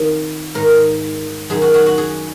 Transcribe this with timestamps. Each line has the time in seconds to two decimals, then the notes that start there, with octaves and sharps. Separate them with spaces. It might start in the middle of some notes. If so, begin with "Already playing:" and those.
Already playing: F2 D#3
0.55 G#2 D#3 A#4
1.50 F#2 D#3 G#4
1.62 F#4
1.74 F#4
1.86 F#4
1.98 G#4